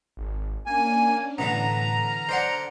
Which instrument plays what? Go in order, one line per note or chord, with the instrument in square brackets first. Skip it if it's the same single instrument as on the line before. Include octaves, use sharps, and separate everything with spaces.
[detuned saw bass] G#1
[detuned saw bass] A#3 [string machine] C#4 D4 [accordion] G#5
[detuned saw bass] A2 [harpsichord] D3 E3 B3 [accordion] A#5
[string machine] F6
[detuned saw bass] D3 [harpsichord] C5 D5 F#5